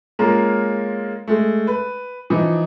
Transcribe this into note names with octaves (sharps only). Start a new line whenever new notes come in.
G#3 A#3 C#4 F4 A#4
G#3 A3
B4
E3 F3 D#4